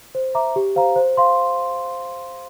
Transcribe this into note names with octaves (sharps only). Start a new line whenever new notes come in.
C5
E5 A#5 D6
G4
C5 F5 A#5
C5
F5 C6